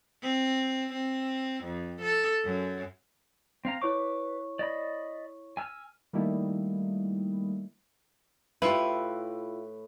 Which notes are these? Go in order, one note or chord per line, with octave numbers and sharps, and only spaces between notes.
C4
C4
F2
A4
F#2
C4 F5 A#5
E4 B4 C#5 C#6 D6
D5 D#5 B5
G#5 E6 F6
D#3 G3 A3 A#3 D#4 E4
A2 E4 F4 G4 B4